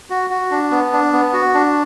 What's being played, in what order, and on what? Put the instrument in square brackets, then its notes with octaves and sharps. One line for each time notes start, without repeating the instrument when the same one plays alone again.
[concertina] F#4
F#4
D4
B3
D4
B3
F#4
D4